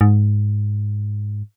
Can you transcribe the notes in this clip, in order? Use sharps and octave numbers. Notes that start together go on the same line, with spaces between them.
G#2